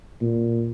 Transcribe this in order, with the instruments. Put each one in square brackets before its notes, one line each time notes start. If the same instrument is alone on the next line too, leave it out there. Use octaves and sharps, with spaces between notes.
[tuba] A#2